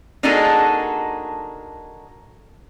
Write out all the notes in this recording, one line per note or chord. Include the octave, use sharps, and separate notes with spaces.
A#3 D4 D#4 F#4 G#4 A4